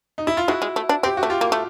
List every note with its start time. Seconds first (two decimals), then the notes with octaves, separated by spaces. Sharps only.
0.18 D#4
0.27 E4
0.37 F4
0.48 G#3 E4 F#4
0.62 G#3
0.76 A3
0.89 D4
1.03 C4 G4
1.17 F#4
1.23 A3
1.30 F4 G4
1.41 A#3
1.52 A3